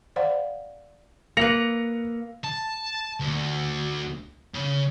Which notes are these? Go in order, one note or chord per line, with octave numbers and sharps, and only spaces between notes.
C5 D5 F5 F#5
A#3 B4 A#6 C#7 F7
A5
D2
C#3